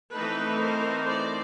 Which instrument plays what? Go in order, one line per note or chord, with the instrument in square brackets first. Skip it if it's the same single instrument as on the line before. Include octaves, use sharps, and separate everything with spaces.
[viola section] E3 A3 C4 D#4 A4 B4
A#4 C5
C5 D5